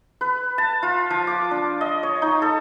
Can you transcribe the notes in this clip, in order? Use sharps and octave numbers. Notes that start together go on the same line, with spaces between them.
B4
A5
F4
F3
D6
D4
D#5
C#5
D#4
A4